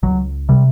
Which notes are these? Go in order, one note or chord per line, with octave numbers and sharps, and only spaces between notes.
C#2 F#3
C3 G3